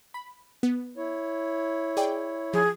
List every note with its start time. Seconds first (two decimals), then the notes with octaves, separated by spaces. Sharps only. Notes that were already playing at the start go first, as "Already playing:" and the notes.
0.14 B5
0.63 B3
0.97 E4 C#5
1.97 G#4 D5 G5
2.53 F3 G#4